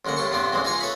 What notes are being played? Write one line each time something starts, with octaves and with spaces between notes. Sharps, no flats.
A1 D3 G#3 A#3 F#5
A2 G3 A5 C6 C#6
E2 G2 B3 C4 G4 C5
A1 G#2 E3 G#3 C4
D#4 F4 G#4 F5 G#5 C#6
A4 B4 C#5 E5 B5